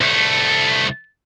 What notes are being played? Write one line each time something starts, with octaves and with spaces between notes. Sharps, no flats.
C2 A3